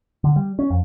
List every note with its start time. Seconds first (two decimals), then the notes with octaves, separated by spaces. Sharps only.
0.24 D3
0.36 G3
0.59 C#4
0.70 F2